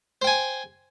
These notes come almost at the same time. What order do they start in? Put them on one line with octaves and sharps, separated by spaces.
C5 G5 G#5